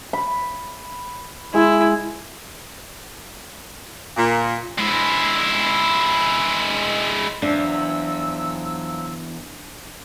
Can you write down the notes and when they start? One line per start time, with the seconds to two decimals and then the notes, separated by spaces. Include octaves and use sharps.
0.13 B5
1.54 G#3 E4
4.17 A#2
4.78 G#3 E4
7.42 E2 F3 F#3 D4 E6